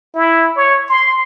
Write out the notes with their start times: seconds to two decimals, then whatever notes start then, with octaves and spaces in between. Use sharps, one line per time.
0.15 E4
0.56 C#5
0.88 C6